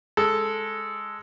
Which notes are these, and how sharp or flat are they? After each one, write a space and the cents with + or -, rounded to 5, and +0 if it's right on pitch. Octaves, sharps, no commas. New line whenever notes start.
G#3 +0 A4 +0